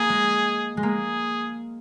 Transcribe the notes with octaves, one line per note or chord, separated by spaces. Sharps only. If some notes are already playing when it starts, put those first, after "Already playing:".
Already playing: A#3 G#4
G#3
G#3
A#3 G#4